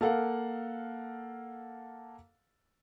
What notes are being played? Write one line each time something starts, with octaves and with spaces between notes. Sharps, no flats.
A#3 A4 F5 F#5